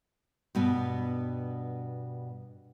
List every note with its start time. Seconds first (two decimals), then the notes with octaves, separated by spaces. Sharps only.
0.55 G2 B2 B3